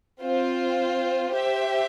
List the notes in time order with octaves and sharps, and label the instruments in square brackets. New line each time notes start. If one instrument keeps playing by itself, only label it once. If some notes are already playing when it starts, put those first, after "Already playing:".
[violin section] C4 F4 C5
G4 C5 E5